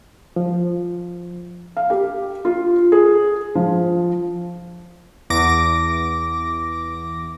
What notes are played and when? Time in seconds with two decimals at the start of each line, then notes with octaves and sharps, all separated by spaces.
0.36 F3
1.77 F5
1.90 G4
2.45 F4
2.92 G#4
3.55 F3
5.30 E2 D6 A#6